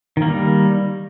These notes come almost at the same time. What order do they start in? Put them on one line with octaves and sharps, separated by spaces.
D#3 A#3 G3